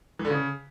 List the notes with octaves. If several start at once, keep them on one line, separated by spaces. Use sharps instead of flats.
E3
D3
C#3